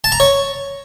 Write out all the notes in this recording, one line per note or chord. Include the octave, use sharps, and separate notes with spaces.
A5
A#5
C#5